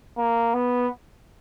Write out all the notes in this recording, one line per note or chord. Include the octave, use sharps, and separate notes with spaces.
A#3
B3